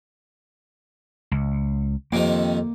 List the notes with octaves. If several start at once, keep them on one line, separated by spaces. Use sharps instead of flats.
C#2
F2 C3 D#3 A#3